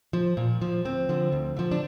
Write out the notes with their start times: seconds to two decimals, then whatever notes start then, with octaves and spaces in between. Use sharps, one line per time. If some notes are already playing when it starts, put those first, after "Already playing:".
0.13 F3
0.37 A#2
0.61 F3
0.85 D2 C4
1.09 D3 F3
1.32 D2
1.57 D3 F3
1.71 D4